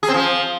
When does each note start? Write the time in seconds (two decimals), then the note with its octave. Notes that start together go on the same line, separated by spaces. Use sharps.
0.03 G#4
0.08 C4
0.14 F3